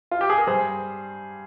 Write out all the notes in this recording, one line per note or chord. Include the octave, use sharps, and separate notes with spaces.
F4
G4
G#4
A#4
G2 G3 G#4 C5